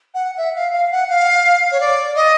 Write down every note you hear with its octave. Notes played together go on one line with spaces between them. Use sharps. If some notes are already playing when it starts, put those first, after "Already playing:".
F#5
E5
F5
F5
F#5
F5
C#5
D5
D#5